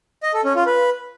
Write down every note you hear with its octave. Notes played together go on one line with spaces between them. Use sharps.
D#5
A4
C#4
F4
B4